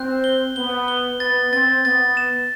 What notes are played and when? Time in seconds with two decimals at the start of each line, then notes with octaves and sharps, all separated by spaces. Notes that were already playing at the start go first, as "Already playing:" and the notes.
Already playing: C4 F#6 G6
0.24 G7
0.56 B3 G7
0.88 G7
1.20 B3 A6
1.52 C4 A6
1.84 B3 A6
2.17 E7